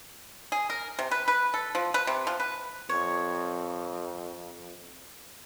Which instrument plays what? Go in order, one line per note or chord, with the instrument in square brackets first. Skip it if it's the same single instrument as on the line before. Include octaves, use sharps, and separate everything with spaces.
[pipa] G#4
A#4
C3
B4
B4
A4
F3
B4
C3
F3
B4
[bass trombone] F2 [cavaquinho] C#5